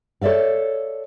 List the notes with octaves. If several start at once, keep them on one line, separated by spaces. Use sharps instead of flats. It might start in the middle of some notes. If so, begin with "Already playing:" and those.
A4 C#5 D5 E5 F5